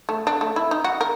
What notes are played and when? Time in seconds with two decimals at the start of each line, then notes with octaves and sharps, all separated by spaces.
0.09 A3
0.27 D4
0.41 A3
0.56 E4
0.71 D#4
0.84 F#4
1.01 A#4